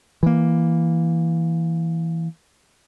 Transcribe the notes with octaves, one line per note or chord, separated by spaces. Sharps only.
E3 A#3